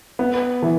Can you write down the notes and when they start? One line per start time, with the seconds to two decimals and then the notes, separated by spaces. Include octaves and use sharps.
0.19 B3
0.62 E3